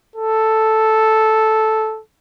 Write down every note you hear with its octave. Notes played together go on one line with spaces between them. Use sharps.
A4